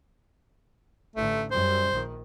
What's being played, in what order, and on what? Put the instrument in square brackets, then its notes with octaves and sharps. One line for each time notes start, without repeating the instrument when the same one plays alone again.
[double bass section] A1 D3 [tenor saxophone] A3
[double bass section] F#2 G3 [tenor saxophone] C5
[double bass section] A#1 D#3